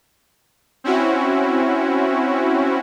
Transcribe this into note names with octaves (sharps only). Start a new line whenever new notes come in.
C4 C#4 E4 F#4